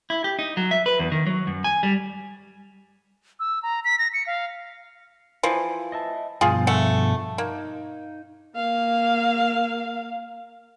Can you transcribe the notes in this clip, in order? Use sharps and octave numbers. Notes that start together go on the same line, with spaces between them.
E4
G4
D#4
F#3
E5
B4
E2
D#3
F#3
F#2
G#5
G3
E6
A#5
B6
A#6
C#7
F5
E3 F3
D#5 E5 A5
G2 B2 F3 F4 G#4
A3 E5 F#5
A#3 D#4
A#3 F5